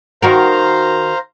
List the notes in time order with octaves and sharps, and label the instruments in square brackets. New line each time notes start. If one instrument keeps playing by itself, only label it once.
[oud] D#3 F#4 A#4 [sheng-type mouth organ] C5 F5 A#5